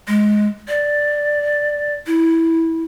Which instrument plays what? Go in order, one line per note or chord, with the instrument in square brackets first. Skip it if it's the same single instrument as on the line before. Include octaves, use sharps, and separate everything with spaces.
[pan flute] G#3
D5
E4